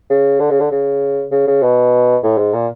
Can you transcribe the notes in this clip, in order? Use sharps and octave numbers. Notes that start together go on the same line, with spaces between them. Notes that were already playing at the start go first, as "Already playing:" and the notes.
C#3
D3
C#3
D3
C#3
C#3
C#3
B2
A2
G#2
A#2